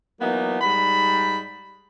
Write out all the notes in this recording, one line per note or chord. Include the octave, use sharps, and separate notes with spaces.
E3 F#3 A#3 B3 D#4
G#2 G3 B5